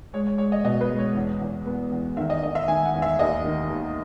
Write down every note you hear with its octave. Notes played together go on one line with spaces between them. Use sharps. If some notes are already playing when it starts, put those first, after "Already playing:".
G#3 C#5
C#5
G#3 C#5
D#5
B2 D#5
B4
G#3
C#5
E2
E2
B3
E2
D#3 E5
D#5
D#3 D#5
E5
D#3 G#5
F#5
E2
E5
D#2 D#5
D#3
D#2